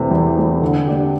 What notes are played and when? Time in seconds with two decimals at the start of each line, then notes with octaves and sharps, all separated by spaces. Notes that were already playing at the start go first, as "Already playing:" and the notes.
Already playing: E2 C3 E3 A3
0.11 E2
0.36 C3 E3 A3
0.62 D3
0.87 A3 D4 G4